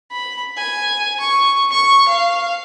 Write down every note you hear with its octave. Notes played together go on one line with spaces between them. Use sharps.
B5
G#5
C#6
C#6
F5